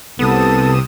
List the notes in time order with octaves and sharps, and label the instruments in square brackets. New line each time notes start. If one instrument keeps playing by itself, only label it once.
[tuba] C2 [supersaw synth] C3 D#6 E7 [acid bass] B3 [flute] A4